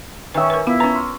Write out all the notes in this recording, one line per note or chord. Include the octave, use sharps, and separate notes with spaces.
D#3 C#4 B4 E5 G5 G#5 D6 D#6
A#4 B4
B3 E4 F4 F5 B5
C#4 B4 A#5
C6 E6 F6